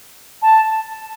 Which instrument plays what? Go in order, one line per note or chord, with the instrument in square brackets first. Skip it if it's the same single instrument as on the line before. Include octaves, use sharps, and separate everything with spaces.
[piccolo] A5